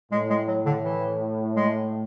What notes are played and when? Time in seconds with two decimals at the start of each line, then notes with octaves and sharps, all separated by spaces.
0.12 A2 G#3
0.30 G#3
0.48 F#3
0.66 D3
0.84 E3
1.56 G#3